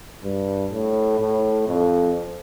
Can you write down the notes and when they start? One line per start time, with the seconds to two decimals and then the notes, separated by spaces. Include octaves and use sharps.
0.23 G2
0.72 A2
1.20 A2
1.67 F2